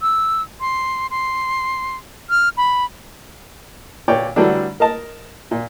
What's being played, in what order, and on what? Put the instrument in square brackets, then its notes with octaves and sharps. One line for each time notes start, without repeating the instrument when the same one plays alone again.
[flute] E6
C6
C6
F6
B5
[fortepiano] A#2 C#5 D5 G5
D3 E3 F#3 G3 A3 D4
A#4 D#5 A5
A#2